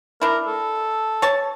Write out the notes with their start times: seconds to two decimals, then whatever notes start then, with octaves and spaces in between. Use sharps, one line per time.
0.22 D4 E4 A#4
0.46 A4
1.22 C#5 A5